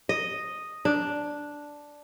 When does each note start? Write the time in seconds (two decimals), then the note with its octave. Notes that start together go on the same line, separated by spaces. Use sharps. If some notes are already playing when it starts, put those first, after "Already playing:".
0.09 D#5
0.85 D4